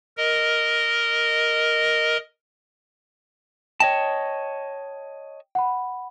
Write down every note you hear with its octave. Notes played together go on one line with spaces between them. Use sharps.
A#4 D#5
C#5 D#5 G5 A5
F#5 B5